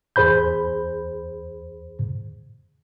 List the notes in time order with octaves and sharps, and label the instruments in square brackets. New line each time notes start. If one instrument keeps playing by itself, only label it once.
[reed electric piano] E2 G#4 C5 B5 G6